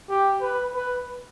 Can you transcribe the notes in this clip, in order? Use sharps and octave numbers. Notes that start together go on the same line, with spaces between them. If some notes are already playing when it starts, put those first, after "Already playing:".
G4
B4
B4